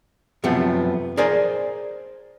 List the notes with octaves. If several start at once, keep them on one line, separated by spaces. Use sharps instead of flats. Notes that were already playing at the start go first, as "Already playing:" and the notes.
F#2 C3 F3 A3 B3
G#4 A#4 C5 D5 G#5